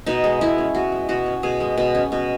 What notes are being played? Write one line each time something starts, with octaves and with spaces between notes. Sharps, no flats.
B2 D#4
G#3
B2 E4
C#4
B2 F#4
G#3
B2 F#4
C#4
B2 G#4
G#3
B2
C#4
B2